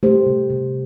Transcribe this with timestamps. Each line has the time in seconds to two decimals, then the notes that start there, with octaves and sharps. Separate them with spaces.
0.03 A3 G4 C5
0.26 C3
0.50 C3